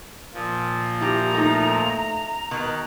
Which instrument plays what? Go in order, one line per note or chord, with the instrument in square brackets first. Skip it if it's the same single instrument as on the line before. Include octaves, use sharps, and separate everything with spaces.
[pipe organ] A#2 F3
[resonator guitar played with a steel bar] E4 G4 [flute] A#5
[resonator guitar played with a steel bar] A3 D#4
[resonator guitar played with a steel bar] B2 [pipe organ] D#3 F#6